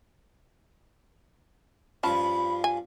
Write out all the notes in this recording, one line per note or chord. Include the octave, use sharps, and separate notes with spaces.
G2 F3 C#4 A5 B5
G#5